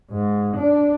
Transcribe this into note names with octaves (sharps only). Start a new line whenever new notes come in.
G#2
D4